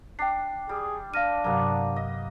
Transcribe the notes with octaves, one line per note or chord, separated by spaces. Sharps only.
D4 G5 C7
G3 G#4
D4 F5 F6 A#6 D#7
G2 C3 F#3 A#3 B3
D#5